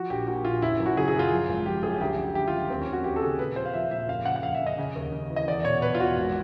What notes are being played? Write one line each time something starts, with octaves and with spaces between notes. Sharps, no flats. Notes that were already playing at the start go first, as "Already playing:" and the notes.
Already playing: F3 F#4
A#1 G4
A#2 F#4
A#2 F4
F#1 E4
F#2
F#4
C#3 G#4
G#4
F#2
F4
F3
G#1
F3 G4
F#2 G#4
D2 G4
D3
D3 G4
F4
F3
D#2 C4
C#4
D#2
F#4
D#2 G4
A4
C#3 G#4
A#2 B4
F3 C5
F5
F3 E5
A#2 E5
F#1 F5
C#3 F#5
F#5
F2 F5
E5
C#3
D#5
C#3
D#2
C#3
E3
D#5
E2 D5
B2 C#5
B2 B4
F4
E2 F#4
G#1